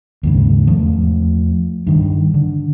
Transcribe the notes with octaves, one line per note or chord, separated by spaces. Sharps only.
D#2 G#2 C#3
E2 F3 A3
G2 D#3
D3